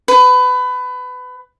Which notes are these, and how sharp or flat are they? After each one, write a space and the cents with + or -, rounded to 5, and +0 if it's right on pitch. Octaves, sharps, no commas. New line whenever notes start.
B4 +25